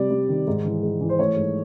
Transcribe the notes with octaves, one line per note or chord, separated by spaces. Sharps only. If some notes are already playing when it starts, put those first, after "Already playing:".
Already playing: C3 G3 D5
G3
D#3
G#2
E3
G#3
E3
C5
A3 C#5
G#2